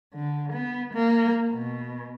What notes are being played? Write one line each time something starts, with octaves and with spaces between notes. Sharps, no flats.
D3
B3
A#3
B2